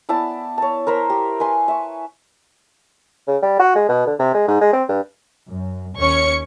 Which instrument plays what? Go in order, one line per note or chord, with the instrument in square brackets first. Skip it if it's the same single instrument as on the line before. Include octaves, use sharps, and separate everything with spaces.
[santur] B3 E4 D5 A5
C#5 A5
A#4 C5 A#5 B5
G4
B4 G#5 C6
E5 C#6
[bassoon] C#3
G3
F#4
G#3
B2
D3
C3
G#3
G#2
G#3
C4
G2
[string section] F#2
D#2 C#4 C#5 C#6 C#7